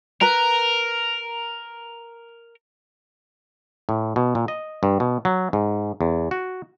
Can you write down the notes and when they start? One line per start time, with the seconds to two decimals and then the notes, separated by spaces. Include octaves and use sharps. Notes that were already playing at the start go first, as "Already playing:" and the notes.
0.21 A#4 B4 A#5
3.89 A2
4.16 B2
4.35 A#2
4.48 D#5
4.83 G2
5.00 B2
5.25 F#3
5.53 G#2
6.01 E2
6.31 F#4